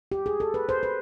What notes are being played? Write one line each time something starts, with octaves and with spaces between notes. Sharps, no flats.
G4
G#4
A4
B4
C5
B4